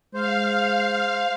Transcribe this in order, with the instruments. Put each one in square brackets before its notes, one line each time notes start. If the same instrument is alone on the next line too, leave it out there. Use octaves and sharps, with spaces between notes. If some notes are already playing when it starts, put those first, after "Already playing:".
[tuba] G#3 [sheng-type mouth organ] C5 [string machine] F5